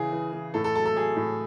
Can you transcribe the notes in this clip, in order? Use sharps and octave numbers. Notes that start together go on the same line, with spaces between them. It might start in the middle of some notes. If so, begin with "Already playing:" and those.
Already playing: C#3 E3 G#4
E3
E3
A2 A4
A4
F#3 A4
A4
F#3 G#4
A2